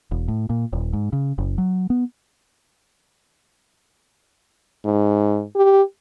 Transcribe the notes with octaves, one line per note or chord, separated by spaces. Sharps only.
E1
A2
A#2
D#1
G#2
C#3
F#1
F#3
B3
G#2
G4